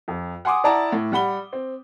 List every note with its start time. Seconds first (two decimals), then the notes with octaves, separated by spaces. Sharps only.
0.08 F2
0.45 F#5 G#5 C6 D6 D#6
0.64 E4 D5 F#5 A5 A#5
0.92 A2
1.12 G3 F#5 B5 G7
1.53 C4